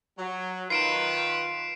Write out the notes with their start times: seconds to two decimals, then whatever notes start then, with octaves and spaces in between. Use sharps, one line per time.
0.18 F#3
0.70 D#3 F4 B4 C7 D7 E7